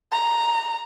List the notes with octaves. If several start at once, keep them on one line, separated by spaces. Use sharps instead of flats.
A#5